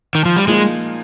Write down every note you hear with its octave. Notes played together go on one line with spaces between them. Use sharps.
D#3
F3
G3
A#2 F3 G#3 A#3 D#4